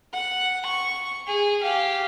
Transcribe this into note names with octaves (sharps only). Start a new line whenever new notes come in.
F#5
C#6
G#4
G4 F5